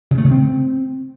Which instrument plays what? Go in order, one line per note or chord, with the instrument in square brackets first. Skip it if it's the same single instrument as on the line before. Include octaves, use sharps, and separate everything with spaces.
[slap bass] C#3
A3
C#3
C4